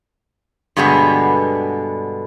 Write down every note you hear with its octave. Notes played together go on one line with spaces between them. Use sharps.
G2 B2 D3 G#3 B3